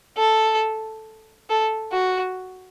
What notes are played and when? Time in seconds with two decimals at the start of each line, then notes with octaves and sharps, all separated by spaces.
0.18 A4
1.50 A4
1.93 F#4